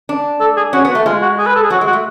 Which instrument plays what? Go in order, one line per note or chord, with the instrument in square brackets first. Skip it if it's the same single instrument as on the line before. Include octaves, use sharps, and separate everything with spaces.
[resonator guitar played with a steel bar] D4
[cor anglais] A4
G#4
[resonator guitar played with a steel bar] C#4 [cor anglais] F#4
[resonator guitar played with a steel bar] B3
[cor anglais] F#4
[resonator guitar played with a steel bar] A3
[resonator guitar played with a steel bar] G#3 [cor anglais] F4
[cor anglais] F#4
G#4
B4
A4
G#4
[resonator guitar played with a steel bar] F#3 [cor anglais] F#4
[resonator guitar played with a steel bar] G#3
[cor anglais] F#4
[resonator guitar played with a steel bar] A3